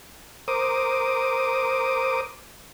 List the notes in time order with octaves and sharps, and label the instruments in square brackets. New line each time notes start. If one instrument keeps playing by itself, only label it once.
[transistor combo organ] A#4 C5 D6 D#6